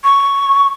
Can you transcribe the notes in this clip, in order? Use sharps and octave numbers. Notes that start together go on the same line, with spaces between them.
C#6